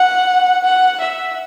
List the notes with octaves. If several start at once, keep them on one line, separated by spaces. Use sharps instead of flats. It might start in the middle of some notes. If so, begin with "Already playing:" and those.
Already playing: F#5
F#5
E5